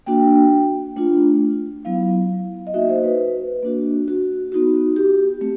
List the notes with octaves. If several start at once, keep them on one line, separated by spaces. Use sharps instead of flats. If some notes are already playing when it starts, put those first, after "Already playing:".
A#3 D4 F#4 G5
A3 D4 F4
F#3 B3 E4 F5
D#5
A#3 D#4 F#4 E5
C5
B4
A#3 D4 F#4
F#4
B3 D#4 F#4
G4
A3 C4